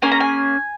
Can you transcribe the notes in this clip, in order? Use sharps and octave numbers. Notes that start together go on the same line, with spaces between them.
A#3 C#4 G#4 G#5
A#5
G#5